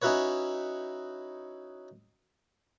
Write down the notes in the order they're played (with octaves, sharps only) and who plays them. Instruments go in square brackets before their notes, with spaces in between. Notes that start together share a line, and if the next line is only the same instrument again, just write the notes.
[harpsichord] C#4 D#4 E4 F#4 B4 C#5